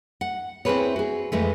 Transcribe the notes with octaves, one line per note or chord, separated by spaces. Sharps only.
F#5
C4 E4 F4 G#4 B4 C#5
F#4 G#4
F2 E3 G#3 A3